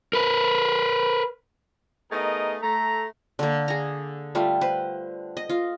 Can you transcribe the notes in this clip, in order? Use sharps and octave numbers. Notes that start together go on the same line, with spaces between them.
A#4 B4
A3 B3 D#4 G#4 A#4 D#5
A3 A#5
D3 A#3
G#4 A#5
G3 A3 F4
B4 C5
D#5
F4